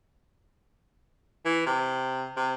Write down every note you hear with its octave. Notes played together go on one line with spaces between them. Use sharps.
E3
C3
C3